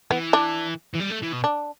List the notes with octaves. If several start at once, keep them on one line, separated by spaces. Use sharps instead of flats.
E3 B3
D4
E3
G3
A3
E3
B2
D4